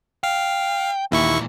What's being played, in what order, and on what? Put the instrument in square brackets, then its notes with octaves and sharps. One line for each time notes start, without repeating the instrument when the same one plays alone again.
[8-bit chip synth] F5 [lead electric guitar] G5
[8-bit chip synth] D#2 E4 C#6 [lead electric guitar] A#2 E3